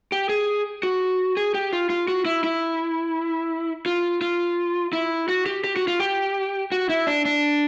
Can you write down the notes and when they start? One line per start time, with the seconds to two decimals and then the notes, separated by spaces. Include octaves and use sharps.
0.12 G4
0.29 G#4
0.83 F#4
1.37 G#4
1.54 G4
1.72 F4
1.90 F4
2.08 F#4
2.25 E4
2.44 E4
3.86 F4
4.21 F4
4.93 E4
5.28 F#4
5.46 G4
5.64 G4
5.76 F#4
5.88 F4
6.00 G4
6.72 F#4
6.89 E4
7.07 D4
7.25 D4